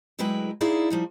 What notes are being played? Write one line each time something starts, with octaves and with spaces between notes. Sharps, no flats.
D2 F#3 G#3 E4 B4 G5
D#4 E4 G#4 D5 F5
F3 G3 D#4